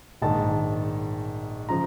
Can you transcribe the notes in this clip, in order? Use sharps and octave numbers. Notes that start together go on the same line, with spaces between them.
A#1 G#2 D#3 A5
C#3 F3 A#5